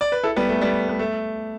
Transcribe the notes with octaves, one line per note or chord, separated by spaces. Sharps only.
D5
B4
E4 A4
G3 B3
A3
G3 B3
B3
A3